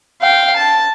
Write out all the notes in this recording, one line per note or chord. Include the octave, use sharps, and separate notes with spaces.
F5 G5
A5